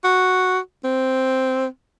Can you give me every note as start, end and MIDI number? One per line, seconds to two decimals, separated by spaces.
0.04 0.59 66
0.84 1.66 60